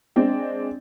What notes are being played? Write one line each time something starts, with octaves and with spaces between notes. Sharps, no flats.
G#3 C4 D4